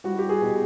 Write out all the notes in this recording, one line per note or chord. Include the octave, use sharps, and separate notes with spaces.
G3 F#4
G4
G#4
B2